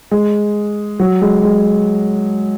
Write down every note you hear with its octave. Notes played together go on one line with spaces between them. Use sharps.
G#3
F#3
G#3
G#3